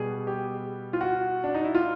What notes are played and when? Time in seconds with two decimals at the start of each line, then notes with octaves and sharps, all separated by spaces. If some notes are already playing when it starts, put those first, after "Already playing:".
Already playing: B2 G3 B3 G#4
0.27 G4
0.93 F4
1.01 F#4
1.44 D4
1.54 D#4
1.64 E4
1.75 F4